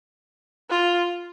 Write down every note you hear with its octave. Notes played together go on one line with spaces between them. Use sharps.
F4